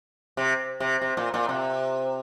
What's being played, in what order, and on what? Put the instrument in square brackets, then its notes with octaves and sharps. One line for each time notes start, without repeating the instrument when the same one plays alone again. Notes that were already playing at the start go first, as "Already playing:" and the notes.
[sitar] C3
C3
C3
A#2
A#2
C3